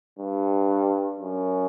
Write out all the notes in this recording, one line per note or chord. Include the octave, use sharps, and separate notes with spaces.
G2
F#2